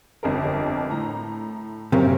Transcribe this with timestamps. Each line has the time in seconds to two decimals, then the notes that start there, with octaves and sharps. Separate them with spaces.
0.23 G1 F2 A#4
0.90 A2 A#5
1.92 F#2 C3 A#3 C#4 A#4